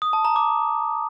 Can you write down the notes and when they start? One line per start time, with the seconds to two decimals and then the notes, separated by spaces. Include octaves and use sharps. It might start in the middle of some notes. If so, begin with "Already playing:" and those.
0.02 D#6
0.13 A5
0.25 A#5
0.36 D6